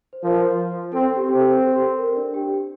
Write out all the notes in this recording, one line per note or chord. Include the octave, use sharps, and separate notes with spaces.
C5
F3 A#4
C4 A4
G4
C4 G4
A4
G4
A4
A#4
D4 D5
G4 G5